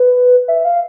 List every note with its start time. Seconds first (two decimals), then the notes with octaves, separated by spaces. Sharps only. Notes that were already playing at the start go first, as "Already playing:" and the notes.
Already playing: B4
0.48 E5
0.65 F5